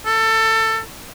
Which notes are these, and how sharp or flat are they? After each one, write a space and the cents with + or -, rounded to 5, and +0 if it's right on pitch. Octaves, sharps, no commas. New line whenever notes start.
A4 +20